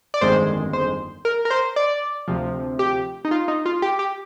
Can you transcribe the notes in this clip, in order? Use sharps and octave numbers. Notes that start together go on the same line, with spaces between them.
D5
G1 F2 D#3 G#3 C5
C5
A#4
A#4
C5
D5
D2 C3 F3
G4
D#4
F4
D#4
F4
G4
G4